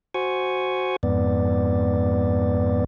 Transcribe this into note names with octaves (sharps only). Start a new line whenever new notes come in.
F#4 C5 G#5 C#6
F2 G#2 B3 D5